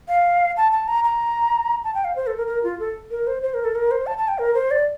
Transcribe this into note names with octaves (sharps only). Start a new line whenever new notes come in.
F5
A5
A5
A#5
A#5
A5
G5
F5
C5
A4
A#4
A#4
F4
A4
A#4
C5
C5
A#4
A4
A#4
C5
A5
A5
G5
A#4
C5
D5